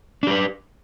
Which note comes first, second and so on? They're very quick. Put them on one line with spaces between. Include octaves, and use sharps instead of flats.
D4 G4 B4